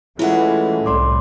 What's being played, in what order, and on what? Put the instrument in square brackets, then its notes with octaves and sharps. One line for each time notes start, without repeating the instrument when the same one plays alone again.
[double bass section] E3 G#3 [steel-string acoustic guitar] A3 C#4 [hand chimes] E4 F4 F#5
[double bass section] C2 A2 [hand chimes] D5 C6 D6